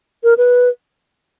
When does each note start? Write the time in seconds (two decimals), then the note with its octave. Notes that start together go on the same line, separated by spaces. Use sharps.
0.24 A#4
0.38 B4